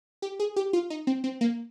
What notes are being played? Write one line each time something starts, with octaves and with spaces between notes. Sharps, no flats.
G4
G#4
G4
F4
D#4
C4
C4
A#3